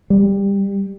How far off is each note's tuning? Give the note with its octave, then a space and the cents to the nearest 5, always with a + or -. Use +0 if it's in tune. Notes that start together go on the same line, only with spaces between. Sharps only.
G3 +15